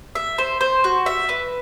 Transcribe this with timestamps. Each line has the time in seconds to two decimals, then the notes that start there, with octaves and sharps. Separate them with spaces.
0.15 E5
0.38 C5
0.61 C5
0.84 F#4
1.06 E5
1.29 B4